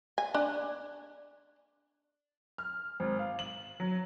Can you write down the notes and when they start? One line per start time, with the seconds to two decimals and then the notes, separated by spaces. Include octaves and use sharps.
0.18 G#5
0.34 D4
2.58 F6
3.00 G#1
3.19 F5
3.39 F#7
3.80 F#3